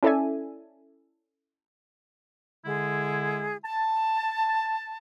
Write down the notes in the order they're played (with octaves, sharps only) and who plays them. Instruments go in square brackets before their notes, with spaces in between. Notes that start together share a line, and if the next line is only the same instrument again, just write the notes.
[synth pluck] C#4 E4 A4 D5 E5 G#5
[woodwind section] D3 G#3 E4 G#4
A5